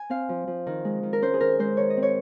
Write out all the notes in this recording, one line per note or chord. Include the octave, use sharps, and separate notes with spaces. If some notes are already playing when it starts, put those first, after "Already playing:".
Already playing: G#5
C4 F5
F3
F3
D#3
G#3
D#3
A#4
C#4 C5
G#4
D#3 A#4
G#3 C5
D#3 C#5
D#5
C4
C#5